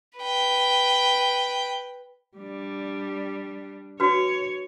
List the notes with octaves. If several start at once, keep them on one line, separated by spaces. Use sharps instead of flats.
B4 G5
G3 D4
D4 F#4 B4 C#5